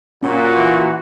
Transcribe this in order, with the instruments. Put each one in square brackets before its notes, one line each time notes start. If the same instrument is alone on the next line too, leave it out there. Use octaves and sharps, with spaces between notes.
[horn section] A#2 [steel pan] C#4 [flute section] F#4
[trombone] E3